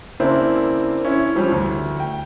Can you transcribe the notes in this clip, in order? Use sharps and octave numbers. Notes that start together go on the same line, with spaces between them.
C#3 A#3 C4 D4 E4
C#4 E4
E3 F3 G3 C#4 D4
D2
G5